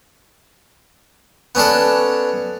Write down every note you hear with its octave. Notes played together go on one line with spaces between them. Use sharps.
B3 C#4 D4 A4